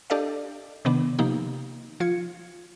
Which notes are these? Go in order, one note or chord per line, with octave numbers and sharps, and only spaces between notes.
D4 G4 A4 D5 D#5 F5
C3 D#3 B3 D4
C3 F3 A#3 D#4 G4
F3 F4 G#6 C#7